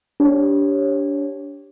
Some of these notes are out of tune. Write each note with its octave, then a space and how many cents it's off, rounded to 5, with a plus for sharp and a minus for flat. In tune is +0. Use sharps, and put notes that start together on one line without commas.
D4 -25 G4 +0 C#5 -20